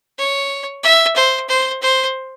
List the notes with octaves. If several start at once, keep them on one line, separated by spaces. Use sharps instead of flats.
C#5
E5
C5
C5
C5